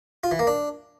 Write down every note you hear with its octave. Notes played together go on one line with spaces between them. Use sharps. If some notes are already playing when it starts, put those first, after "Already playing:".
F4
E3
A#3
D4